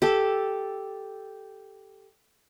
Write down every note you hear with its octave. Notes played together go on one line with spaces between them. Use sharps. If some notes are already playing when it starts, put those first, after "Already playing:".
G4 A4